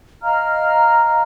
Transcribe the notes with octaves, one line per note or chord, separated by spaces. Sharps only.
D#5 F5 A#5 F6